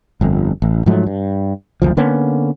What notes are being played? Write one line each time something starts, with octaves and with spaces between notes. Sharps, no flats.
G1 F2
A1
G#2 F3 F#3 A3
G2
F#1 D2 F3
D3 A#3 B3 C#4